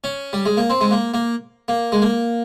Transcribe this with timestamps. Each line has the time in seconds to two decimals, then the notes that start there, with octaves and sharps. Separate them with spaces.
0.04 C#4
0.33 G3
0.46 G#3
0.57 A#3
0.70 C4
0.81 G#3
0.91 A#3
1.14 A#3
1.68 A#3
1.92 G#3
2.02 A#3